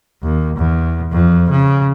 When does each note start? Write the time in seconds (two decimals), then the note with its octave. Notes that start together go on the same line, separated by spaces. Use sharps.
0.23 D#2
0.57 E2
1.11 F2
1.50 C#3